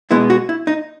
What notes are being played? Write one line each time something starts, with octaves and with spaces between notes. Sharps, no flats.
B2 G#3 B3 E4
F#4
E4
D#4